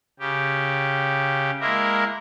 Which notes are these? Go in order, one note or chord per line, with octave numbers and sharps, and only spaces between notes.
C#3 G4
G#3 A#3 E4 A#4